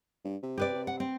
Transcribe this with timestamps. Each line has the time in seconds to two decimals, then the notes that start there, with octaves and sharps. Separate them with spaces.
0.25 G2
0.43 C3
0.58 G4 B4 D5
0.74 C3
0.87 F#5
1.00 C4